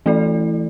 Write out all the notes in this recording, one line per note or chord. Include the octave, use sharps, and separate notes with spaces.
E3 A3 E4 A4 D5